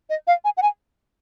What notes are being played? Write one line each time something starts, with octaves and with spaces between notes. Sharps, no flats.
D#5
F5
G#5
F#5
G#5